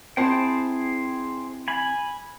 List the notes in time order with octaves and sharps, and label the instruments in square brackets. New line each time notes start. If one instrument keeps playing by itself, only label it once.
[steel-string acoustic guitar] C4 E4 A5 [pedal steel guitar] G#4 C5 G5
[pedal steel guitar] G#5 B5